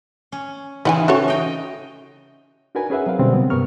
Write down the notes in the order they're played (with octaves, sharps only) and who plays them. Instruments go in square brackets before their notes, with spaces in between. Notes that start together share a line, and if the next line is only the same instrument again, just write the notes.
[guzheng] C#4
[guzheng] C#3 E3 C4 [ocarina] D#4 [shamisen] B4 F#5 G#5
[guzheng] E3 [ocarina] C#4 [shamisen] F#4 A4 C#5
[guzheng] D#5 G5 A#5
[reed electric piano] D4 D#4 F#4 A#4 B4 G#5
C#4 G#4 B4 E5 F#5
F#3 C4 A#4 F5
B2 D3 G3 C4 C#4
C3 F#3 B3
G2 C3 B3 A#4 C#6 F6